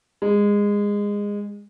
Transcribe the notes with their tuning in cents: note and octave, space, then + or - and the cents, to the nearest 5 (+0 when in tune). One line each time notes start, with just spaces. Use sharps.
G#3 -20